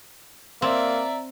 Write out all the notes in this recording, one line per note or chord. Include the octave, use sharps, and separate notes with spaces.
A#3 C4 D5 E5 A#5